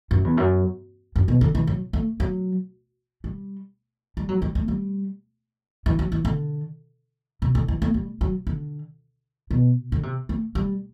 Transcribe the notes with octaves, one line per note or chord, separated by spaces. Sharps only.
F#2
E2
F#2
F#2
B2
D3
E3
F#3
A3
F#3
G3
G3
F#3
G3
A3
G3
E3
F#3
E3
D3
C3
D3
E3
A3
G3
F#3
D3
B2
D3
C3
A3
G3